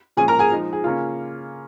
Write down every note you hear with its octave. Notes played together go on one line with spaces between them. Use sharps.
A#2 F3 G#3 C#4 G#4 G#5
A#4 A#5
G#4 G#5
F3 G#3 D#4
G#4
C#3 A#3 C#4 F4